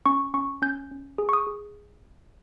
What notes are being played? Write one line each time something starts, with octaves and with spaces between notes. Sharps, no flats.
C#4 C#6
C#4 C#6
C#4 G6
C#4
G#4
C#6
D#6
G#4